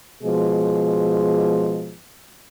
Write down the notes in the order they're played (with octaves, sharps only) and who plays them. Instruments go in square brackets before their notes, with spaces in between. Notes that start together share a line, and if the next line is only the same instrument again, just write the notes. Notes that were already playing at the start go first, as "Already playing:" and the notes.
[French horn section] B2 F3 G#3 G#4